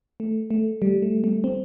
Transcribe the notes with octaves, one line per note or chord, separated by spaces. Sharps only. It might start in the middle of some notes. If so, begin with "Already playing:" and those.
A3
A3
G3
A3
A3
C4